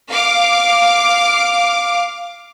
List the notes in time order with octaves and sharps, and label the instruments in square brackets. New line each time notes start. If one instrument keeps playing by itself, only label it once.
[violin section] F5 D6